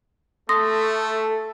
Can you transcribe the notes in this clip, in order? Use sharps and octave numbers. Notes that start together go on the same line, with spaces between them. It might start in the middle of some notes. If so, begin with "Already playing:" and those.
A3 A4 C6 D#6 A#6